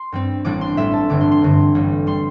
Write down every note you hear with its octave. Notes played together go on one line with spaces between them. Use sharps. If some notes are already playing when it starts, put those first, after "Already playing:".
Already playing: C6
G2 G3 C4
A1 A2 G3 D4 D6
C6
A1 A2 G3 D4 E5
A5
G1 G2 D3 D6
C6
C6
G1 G2 D3
A1 G2 G3
G3 C6